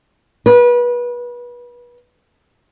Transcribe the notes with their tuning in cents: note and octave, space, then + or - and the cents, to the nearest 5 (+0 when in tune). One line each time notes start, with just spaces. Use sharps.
B4 -30